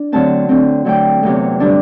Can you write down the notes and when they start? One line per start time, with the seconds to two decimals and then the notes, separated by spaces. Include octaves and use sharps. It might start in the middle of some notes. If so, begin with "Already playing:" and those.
Already playing: D4
0.12 D3 F#3 A3 C4 A5
0.49 D3 A3 C4
0.85 D3 F#3 A3 G5
1.23 E2 C3 F#3 A3
1.60 D3 G3 D4